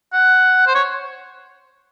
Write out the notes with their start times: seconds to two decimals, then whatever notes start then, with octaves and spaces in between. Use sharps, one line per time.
0.13 F#5
0.67 C5
0.75 C#5